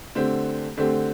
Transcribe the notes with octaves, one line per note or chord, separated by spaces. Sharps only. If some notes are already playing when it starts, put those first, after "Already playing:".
D3 A3 C4 G4
D3 A3 C4 G4